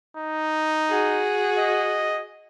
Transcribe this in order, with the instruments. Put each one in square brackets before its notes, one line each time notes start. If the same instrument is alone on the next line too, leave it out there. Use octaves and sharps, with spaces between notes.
[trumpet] D#4
[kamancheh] F#4 G#4
[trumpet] D#5